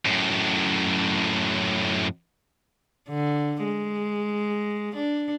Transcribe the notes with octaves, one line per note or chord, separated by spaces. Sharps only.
F#2 A2
D3
G#3
D4